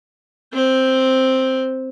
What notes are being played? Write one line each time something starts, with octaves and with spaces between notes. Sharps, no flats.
C4 C5